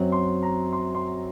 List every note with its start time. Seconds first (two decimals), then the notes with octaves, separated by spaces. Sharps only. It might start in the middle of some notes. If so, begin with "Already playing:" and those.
Already playing: F#2 F#3 C4
0.12 C6
0.43 A#5
0.73 C6
0.95 C6